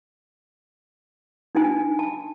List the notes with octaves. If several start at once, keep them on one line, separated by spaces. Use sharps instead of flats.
D4 D#4 G#5
A5